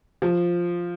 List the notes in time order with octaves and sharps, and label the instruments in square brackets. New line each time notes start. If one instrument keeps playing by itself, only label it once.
[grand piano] F3